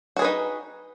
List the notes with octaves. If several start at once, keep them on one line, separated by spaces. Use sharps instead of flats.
D#4 F#4 G#4 B4